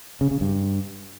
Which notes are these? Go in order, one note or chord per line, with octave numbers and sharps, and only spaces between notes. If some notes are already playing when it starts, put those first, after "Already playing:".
C#3
C#3
G2